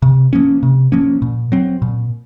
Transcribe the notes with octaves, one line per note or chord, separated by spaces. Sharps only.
C3
F3 A#3 C#4
C3
F3 A#3 C#4
A#2
F#3 C4
A#2